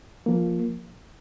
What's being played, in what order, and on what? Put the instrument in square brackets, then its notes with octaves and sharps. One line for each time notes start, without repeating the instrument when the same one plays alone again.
[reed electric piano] F3 A#3